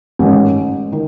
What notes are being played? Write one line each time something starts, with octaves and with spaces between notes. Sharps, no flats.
A1 G#2 D#3
D#3